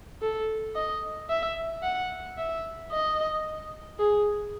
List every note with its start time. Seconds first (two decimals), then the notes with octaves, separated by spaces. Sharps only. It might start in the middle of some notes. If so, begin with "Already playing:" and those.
0.22 A4
0.75 D#5
1.30 E5
1.83 F#5
2.38 E5
2.92 D#5
3.99 G#4